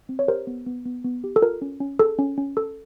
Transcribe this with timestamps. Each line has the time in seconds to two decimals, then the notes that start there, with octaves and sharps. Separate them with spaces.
0.09 C4
0.19 C#5
0.28 G4 A#4 C5
0.47 B3
0.66 B3
0.85 B3
1.05 B3
1.24 G4
1.36 A4
1.42 F4 A#4
1.62 C#4
1.80 C#4
1.99 G#4 A4
2.19 C#4
2.38 C#4
2.57 A4